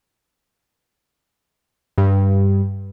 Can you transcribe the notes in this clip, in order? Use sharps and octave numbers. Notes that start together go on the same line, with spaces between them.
G2